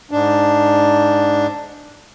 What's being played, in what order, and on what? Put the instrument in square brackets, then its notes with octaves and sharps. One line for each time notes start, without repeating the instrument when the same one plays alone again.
[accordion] G#2 D4